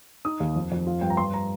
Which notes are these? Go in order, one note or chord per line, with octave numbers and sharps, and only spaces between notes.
D#4 D#6
D#2
F2
F2
F4
G2 G5
A#5
G2 C6
A#5